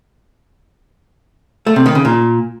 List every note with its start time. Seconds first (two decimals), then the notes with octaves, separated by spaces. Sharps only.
1.67 A3
1.76 C3
1.86 D#3
1.95 C#3
2.05 A#2